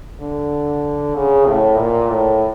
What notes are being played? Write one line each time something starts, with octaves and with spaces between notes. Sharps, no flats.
D3
C#3
A2
A#2
A2